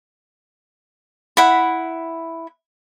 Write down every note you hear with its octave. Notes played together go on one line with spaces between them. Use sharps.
E4 F#5 B5